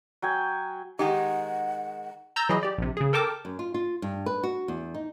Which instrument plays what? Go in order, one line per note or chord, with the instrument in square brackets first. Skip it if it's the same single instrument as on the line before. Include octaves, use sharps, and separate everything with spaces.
[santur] F#3 G5 G#5
[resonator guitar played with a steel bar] D#3 G#3 D#4 [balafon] G4 G5 [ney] F#5
[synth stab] A#5 E6 G6 A6 A#6
E3 F#3 E4 G#4 D#5
G4 D5
A#1 C3
C#3 G#4
A4 A#4 G5 A5 D6
[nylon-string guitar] F#2
F4
F4
G2
B4
F#4
E2
D#4